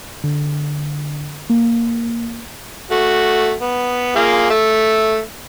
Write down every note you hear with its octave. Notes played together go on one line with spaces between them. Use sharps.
D3
A#3
A3 F#4
B3
A#3 F4 G#4
A3 E5